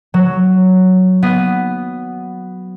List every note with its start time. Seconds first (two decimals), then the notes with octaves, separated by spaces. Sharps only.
0.14 F#3
1.23 B3